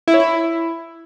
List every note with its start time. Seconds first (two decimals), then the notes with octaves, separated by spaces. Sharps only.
0.08 E4
0.14 C#5
0.20 E4